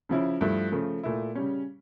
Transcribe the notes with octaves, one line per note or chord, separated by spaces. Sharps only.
C#3 F3 C#4 E4
G2 F3 A3 E4
C#3 F3 A3
A#2 A3 E4
C#3 G3 C#4